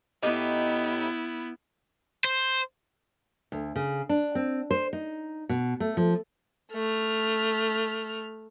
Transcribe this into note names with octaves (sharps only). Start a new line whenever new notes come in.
A2 B3 D#4 E4 G4
C5
D2
C#3
D4
C4
C5
D#4
B2
A3
F3
A3 F6